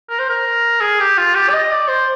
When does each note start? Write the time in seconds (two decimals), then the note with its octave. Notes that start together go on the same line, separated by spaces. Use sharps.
0.10 A#4
0.19 C5
0.29 A#4
0.81 G#4
1.00 G4
1.18 F4
1.35 G4
1.49 D5
1.53 D#5
1.71 D5
1.88 C5